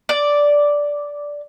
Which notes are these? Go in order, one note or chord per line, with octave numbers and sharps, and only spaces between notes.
D5